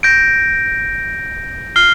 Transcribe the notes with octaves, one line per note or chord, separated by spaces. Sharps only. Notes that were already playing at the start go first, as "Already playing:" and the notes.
G6 A#6 D7
F6 C7 G7